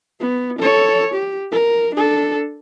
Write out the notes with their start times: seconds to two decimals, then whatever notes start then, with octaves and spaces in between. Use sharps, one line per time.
0.20 B3
0.59 A4 C#5
1.14 G4
1.52 A#4
1.95 D4 A4